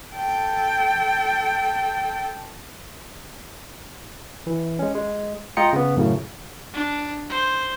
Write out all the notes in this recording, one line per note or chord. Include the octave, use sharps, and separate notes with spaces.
A4 G5
E3
G#3 C#4
G#3
G#3 F4 D#5 G5 A#5 C#7
C#3 B3
F#2 A2 C#3
D4
C5